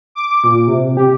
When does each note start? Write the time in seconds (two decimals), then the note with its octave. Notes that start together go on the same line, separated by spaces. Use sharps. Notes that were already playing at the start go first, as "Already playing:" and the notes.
0.15 D6
0.44 A#2
0.67 C3
0.97 G4